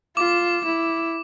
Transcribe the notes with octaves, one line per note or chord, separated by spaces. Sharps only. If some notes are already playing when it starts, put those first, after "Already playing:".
F4 D6
E4